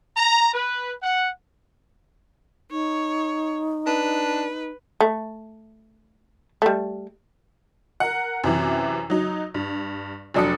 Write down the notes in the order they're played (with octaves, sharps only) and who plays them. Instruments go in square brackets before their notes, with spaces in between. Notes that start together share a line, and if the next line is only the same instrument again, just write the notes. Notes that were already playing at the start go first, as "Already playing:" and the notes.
[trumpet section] A#5
B4
F#5
[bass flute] D#4 [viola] C#5
[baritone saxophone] D4 [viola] B4
[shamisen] A3
G3 A3
[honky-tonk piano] A#4 F#5
F#2 C3 E3
F#3 D#4
G2
F1 F#3 D4 A4 D#6 C#7